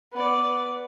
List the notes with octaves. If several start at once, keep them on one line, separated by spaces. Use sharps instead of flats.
B3 D5